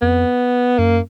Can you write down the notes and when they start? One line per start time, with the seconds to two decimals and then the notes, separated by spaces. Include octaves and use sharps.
0.02 F2 B3
0.78 F#2 A#3